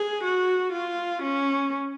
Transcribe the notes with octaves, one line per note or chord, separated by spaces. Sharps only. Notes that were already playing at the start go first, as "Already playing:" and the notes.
Already playing: G#4
F#4
F4
C#4